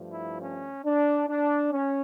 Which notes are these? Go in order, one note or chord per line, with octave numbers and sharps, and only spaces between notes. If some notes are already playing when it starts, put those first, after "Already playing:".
Already playing: G2 F3 A3
E4
C#4
D4
D4
C#4